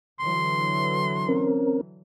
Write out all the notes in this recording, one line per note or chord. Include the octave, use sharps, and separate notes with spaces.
D3 E3 F#3 C6
C4 C#4 A#4